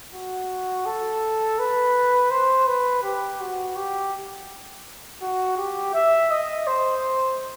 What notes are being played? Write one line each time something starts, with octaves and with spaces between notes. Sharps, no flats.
F#4
A4
B4
C5
B4
G4
F#4
G4
F#4
G4
E5
D#5
C5